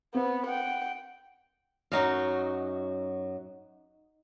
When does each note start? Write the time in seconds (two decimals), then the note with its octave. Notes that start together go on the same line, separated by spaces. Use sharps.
0.15 B3 C4
0.46 F#5 G5
1.92 F#2 F#3 D#4 F#4 F5